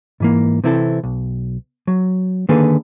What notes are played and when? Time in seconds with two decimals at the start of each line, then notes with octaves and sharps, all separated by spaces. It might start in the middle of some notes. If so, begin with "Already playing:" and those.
0.20 G#2 E3 A#3
0.64 C3 E3 C4 E4 G#4 A4
1.04 B1
1.87 F#3
2.49 D3 D#3 A#3 G#4 A4 B4